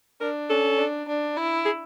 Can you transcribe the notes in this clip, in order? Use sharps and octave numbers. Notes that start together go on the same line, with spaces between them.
D4 A#4
C#4 A4
D4
D4
E4
G#4